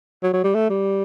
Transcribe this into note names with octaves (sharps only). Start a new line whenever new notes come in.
F#3
F#3
G3
A3
G3